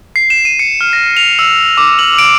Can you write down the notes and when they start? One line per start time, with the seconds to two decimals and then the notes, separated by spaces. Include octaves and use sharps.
0.16 C7
0.30 E7
0.45 D#7
0.59 C#7
0.81 F6
0.93 A#6
1.17 F7
1.39 E6
1.77 D6
1.99 F#7
2.18 D7